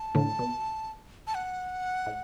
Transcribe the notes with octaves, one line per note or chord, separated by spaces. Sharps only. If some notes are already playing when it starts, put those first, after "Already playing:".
Already playing: A5
A2 D3
B2
A5
F#5
A2